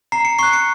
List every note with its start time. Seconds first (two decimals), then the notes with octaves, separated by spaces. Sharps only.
0.12 A#5 C7
0.25 C#7
0.39 C#6 F#6 C7
0.53 C#7